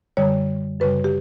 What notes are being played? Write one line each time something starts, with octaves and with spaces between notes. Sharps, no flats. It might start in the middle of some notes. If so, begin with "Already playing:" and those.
F#2 D3 G3 C#5
F#2 C#3 G3 B4
G4